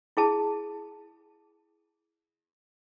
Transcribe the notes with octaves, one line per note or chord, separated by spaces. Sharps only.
E4 G#4 A5